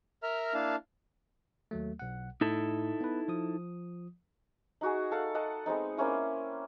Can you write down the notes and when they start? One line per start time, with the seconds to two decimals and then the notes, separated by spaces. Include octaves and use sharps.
0.23 A#4 E5 A#5 F6
0.54 A#3 D4 E4 F5 A5
1.71 D#2 F#3 A3
1.99 B1 F#5
2.41 A2 D#4 E4 A4
3.01 B3 B4
3.28 F3 D#6
4.81 D#4 F#4 G#4
5.11 A4 F5 F#5
5.35 D#5 F#5 A5
5.66 G#3 B3 C4 D#4
5.97 A#3 C4 C#4 E4